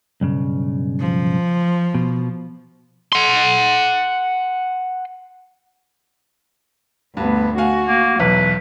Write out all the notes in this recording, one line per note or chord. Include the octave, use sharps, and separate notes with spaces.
B1 G2 C#3
F3
B2
F#5 C6
D2 G2 B3
F#4 F5 F#5 G#5
A#3
B1 E2 F#3 B4